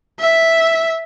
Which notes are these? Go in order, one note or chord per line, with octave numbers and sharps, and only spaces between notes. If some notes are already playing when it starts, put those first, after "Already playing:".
E5